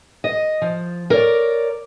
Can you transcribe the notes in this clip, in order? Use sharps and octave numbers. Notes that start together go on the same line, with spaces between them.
D#5
F3
A#4 C#5 D5